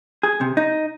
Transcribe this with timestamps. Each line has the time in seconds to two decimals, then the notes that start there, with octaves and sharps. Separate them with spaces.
0.23 G#4
0.41 C3
0.57 D#4